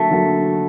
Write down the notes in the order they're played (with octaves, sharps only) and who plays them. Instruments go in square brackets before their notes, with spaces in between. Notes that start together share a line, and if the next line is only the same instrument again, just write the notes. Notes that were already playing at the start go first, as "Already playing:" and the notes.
Already playing: [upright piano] D3 F#3 A#3 F#4 [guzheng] A3
[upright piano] D3 F#3 A#3 F#4